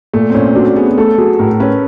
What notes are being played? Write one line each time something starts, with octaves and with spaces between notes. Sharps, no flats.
A#2 A3
C4
A#2 C#4
F#3 D4
B3 G#4
A3 A4
F#3 G#4
A2 A#4
C#4 B4